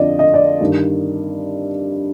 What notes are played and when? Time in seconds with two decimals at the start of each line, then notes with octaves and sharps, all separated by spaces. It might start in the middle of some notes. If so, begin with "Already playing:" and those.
Already playing: F2 D3 F3 D5 D#5
0.19 D#5
0.34 D5
0.61 G2 D#3